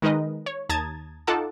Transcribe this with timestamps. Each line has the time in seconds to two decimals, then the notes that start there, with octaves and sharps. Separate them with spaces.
0.02 D#3 G#3 D#4 A#4 B4 D#5
0.46 C#5
0.69 D#2 A5 A#5 D#6 G#6 A6
1.27 D#4 F4 A4 F#5 A5 D6